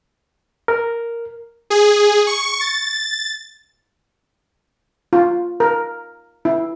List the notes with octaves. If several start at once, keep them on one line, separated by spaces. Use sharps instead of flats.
A#4
G#4
C#6
A6
F4
A#4
E4